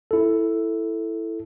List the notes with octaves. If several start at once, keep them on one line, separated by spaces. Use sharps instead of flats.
E4 A4